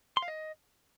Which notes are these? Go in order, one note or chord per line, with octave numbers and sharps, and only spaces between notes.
C6
F5
D#5